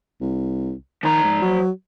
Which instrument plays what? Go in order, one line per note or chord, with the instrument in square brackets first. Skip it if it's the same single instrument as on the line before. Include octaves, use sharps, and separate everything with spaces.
[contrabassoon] C2
[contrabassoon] D#3 [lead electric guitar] F3 A#5
[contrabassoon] G#2
F#3